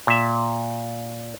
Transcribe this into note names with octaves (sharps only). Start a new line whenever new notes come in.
A#2 E5